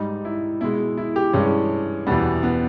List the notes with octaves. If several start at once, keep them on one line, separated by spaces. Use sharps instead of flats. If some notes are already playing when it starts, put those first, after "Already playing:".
Already playing: G#2 G3 D#4
E4
B2 G#3 E4
E4
G4
G2 E3 G#3 C#4
E2 B2 G3 B3
B3